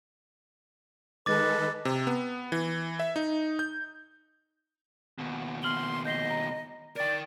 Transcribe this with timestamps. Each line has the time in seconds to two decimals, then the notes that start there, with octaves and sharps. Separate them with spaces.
1.26 D#3 G#3 A4 B4 D#5 D6 A6
1.85 C3
2.07 B3
2.52 E3
3.00 E5
3.16 D#4
3.59 G6
5.19 D#2 B2
5.63 C6 F6 F#7 G7
6.05 D#5 G6 C7 G7
6.30 A#5
6.96 A#4 D5 G5